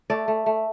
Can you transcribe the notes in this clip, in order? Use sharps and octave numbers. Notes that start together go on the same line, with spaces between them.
A3 D5
A3
A3